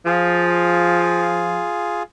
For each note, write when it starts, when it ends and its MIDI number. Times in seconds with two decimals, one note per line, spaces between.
0.06 1.66 53
0.06 2.03 65
0.06 2.03 68